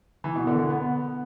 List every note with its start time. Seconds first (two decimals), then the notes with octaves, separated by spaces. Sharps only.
0.24 E3
0.36 B2
0.47 D3
0.58 D3
0.70 B3